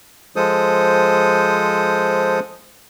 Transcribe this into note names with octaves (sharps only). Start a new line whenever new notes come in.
F3 G#3 A4 C5 D#6